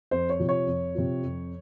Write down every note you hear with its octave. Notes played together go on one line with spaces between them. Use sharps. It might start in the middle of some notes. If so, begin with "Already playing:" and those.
F2 C5
C#5
C3 F3
C#5
F2
C3 F3
F2